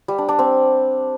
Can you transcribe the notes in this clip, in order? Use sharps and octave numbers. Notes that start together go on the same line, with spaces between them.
G3
D4
D4
C4